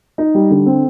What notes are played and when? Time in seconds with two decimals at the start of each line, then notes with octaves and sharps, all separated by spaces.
0.18 D#4
0.34 G3
0.51 D3
0.66 C4